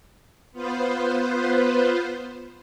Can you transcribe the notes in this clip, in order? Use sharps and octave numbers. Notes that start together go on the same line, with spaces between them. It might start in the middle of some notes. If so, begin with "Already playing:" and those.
B3 F4 B4 C5